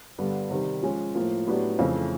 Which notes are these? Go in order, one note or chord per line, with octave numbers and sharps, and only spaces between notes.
G2 D3 G3 B3 D4
C3 D#3 G3
F3 G#3 C#4
A2 F3 A#3
A2 F#3 B3 D4 G4
F2 C#3 E3 A3 C4